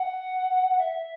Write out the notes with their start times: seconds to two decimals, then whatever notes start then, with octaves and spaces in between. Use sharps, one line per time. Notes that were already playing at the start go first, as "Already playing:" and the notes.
Already playing: F#5
0.78 E5